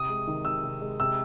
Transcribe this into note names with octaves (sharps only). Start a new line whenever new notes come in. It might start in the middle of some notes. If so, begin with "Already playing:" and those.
Already playing: C3 D#6
G#3
D#3
C3 E6
C3
G#3
C3 E6